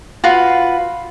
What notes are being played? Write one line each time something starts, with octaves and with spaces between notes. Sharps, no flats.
F4 F#4 B4